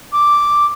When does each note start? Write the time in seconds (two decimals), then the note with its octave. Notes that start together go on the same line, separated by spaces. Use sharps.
0.13 D6